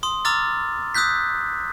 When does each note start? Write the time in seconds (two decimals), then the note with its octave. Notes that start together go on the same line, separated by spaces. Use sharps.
0.03 C6 D#6
0.25 A#5 D6 E6 F6 A6
0.94 D#6 E6 F#6 G6 B6